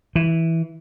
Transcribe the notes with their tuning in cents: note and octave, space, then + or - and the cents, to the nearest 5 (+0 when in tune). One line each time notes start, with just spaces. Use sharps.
E3 -10